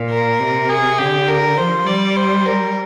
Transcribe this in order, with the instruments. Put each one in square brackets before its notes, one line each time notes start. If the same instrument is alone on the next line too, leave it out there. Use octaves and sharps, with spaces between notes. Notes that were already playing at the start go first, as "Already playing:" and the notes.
Already playing: [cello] A#2
[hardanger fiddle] A#4
[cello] C3
[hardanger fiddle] G#4
[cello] D3 [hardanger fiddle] G4
[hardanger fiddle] A#4
[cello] F3 [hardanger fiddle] C5
[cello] G3 [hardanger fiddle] D5
[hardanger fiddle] C5
A#4